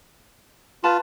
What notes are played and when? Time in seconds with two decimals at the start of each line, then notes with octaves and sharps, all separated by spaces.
0.84 F4 B4 A5 B5